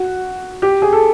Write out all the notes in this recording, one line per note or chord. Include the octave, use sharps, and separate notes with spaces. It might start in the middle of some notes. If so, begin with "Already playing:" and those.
Already playing: F#4
G4
G#4
A4